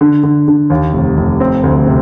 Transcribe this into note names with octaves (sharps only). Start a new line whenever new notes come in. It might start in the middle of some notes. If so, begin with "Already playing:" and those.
D3
D3
D3
D#2
F1
F1
C4
D2
C3